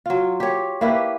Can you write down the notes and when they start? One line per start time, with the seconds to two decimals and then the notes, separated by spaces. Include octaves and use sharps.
0.06 F#3 F4
0.40 G4 C#5
0.81 A#3 E4 G4 B4